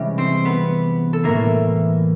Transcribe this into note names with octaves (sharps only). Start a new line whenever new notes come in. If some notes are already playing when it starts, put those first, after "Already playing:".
Already playing: C3 E3 G3 G#3 C#4 G4
C4 C5
B3 B4
A4
A2 E3 A3 A#3 A#4